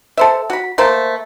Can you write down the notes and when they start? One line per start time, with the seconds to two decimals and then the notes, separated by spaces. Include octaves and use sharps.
0.17 A4 C5 E5
0.50 F#4 B5
0.78 A3 A#3 C5